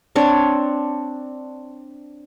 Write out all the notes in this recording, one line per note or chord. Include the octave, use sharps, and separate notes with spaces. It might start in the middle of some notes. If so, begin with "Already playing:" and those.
C4 D4 C#5